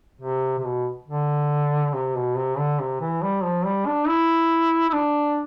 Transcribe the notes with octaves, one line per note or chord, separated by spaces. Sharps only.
C3
C3
B2
D3
C3
B2
C3
D3
C3
E3
G3
F3
G3
D4
E4
E4
D4